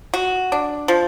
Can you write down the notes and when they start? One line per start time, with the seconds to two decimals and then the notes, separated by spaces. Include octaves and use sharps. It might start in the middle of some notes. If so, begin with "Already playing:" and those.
0.14 F#4
0.52 D4
0.88 F3